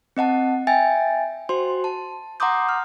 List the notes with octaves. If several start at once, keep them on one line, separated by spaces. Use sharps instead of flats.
C4 D#5 F#5 A5
E5 G5 G#5 A6
F#4 C5 C6
A5
F#5 A#5 C6 D6 D#6 G6
F6